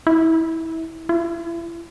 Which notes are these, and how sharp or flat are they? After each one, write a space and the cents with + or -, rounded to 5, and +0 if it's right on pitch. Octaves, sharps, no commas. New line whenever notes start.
E4 -25
E4 +35